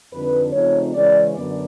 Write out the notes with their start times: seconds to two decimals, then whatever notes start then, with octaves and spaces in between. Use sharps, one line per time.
0.12 F2 D3 G3 C4 D#4 B4
0.53 C#3 F3 A3 C4 D#4 C#5
0.94 C#3 E3 G#3 C#4 D5
1.34 F#2 D3 F#3 B3 D5